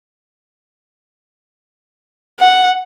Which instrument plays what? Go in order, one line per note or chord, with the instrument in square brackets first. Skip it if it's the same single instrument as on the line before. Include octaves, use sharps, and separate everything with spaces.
[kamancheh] F#5